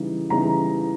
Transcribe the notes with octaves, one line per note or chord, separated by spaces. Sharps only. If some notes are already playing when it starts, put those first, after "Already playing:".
Already playing: C#3 E3 G3 D#4
C#3 E3 G3 B3 D#4 A#5